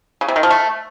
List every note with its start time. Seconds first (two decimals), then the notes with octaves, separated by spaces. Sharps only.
0.21 C#3
0.28 C3
0.36 D#3
0.43 F3
0.50 A3